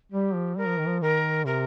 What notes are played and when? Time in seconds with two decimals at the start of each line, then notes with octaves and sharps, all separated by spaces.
0.12 G3 G4
0.35 F3
0.57 G3 A#4
0.67 F3
0.78 D#3
0.87 F3
1.02 D#3 A#4
1.46 C3 A#4